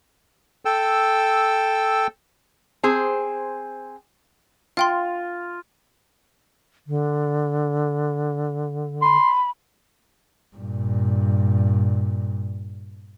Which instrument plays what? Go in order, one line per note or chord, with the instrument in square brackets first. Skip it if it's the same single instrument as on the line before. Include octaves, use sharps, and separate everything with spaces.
[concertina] A4 G5 E6
[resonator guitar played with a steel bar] C4 G#4 C5
[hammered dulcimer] F4 [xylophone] F5 G5 C6
[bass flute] D3
[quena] B5 [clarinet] C6
[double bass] G2 A#2